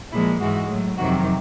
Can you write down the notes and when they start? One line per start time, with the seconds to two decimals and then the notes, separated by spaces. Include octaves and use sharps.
0.12 A#2 F3 G#3 E4
0.40 G#2 E3 G#3 F#4
0.69 A2 F#3
0.97 F2 C3 D#3 F#3 F#4